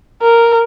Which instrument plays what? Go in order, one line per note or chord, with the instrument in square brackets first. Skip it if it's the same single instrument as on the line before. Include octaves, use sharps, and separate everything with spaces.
[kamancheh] A#4